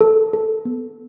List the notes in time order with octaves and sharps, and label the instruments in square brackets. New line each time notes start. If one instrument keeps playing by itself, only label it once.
[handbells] A4
A4
B3